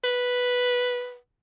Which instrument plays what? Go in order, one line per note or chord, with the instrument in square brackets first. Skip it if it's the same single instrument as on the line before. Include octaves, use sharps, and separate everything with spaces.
[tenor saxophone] B4